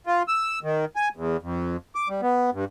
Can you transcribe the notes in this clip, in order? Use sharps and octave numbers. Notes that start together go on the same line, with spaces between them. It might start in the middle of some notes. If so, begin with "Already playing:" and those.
F4
E6
D#3
G#5
E2
F2
D6
G3
B3
G2